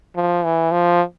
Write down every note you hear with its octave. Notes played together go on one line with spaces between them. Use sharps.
F3
E3
F3